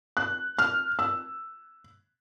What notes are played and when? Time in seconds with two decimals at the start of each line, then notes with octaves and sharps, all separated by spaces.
0.17 F#6
0.59 F6
0.99 E6